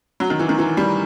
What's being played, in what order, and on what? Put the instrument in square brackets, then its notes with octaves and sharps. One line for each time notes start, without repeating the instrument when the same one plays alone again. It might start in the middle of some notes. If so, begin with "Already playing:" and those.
[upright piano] F#3
D#3
E3
D#3
E3
G3